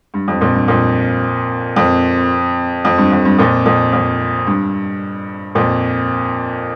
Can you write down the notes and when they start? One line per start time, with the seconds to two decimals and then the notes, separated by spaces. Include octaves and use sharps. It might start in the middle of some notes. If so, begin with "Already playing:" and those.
0.14 G2
0.28 F2
0.41 F2 A#2
0.54 G2
0.68 F2 A#2
1.76 F2
2.85 F2
2.98 G2
3.12 F2
3.25 G2
3.39 F2 A#2
3.66 F2 A#2
3.93 F2
4.47 G2
5.55 F2 A#2